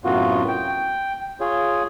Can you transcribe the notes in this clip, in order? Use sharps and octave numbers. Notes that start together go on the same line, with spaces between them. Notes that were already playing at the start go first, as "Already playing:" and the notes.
F#2 A2 C3 B3 F4 F#4
G5
F4 G#4 C#5